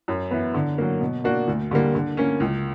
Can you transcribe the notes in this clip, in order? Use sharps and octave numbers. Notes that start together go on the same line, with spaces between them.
F#2
E3 B3 E4
D3
F#3 A#3
B2
A#3 D4 F#4
D2
D3 G3 A#3
D3
A#3 C#4
C#2